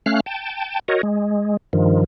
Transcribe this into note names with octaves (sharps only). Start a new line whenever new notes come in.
A3 C#4 F5 F6 F#6
G5 A5
F#4 A#4 C#5 D#5
G#3
G2 D#3 F3